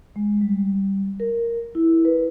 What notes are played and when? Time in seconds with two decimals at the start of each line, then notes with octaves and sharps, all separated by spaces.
0.16 G#3
0.41 G3
1.20 A#4
1.75 E4
2.05 B4